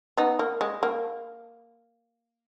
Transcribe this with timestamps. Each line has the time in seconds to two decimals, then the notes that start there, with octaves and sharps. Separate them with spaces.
0.17 B3 D#4
0.39 A#3
0.61 G#3
0.83 A#3